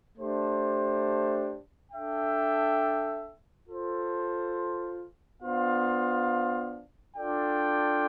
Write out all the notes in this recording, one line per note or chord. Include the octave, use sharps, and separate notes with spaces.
A3 D4 G4 C5
D4 A4 E5 G5
F4 A4 C5
B3 D4 F4 C5 F5
D4 F4 A4 D5 G5